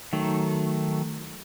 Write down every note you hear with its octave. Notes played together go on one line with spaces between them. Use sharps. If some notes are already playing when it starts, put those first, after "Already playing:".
D#3 F#3 A3